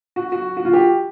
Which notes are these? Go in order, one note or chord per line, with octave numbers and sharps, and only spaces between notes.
F#4
F#4
F#4
F4
G4